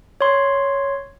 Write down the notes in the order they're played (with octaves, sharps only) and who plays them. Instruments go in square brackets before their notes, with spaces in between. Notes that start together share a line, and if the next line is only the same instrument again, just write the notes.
[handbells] C#5 C6